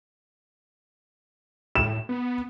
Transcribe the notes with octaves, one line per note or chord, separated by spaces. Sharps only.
A2 E7
B3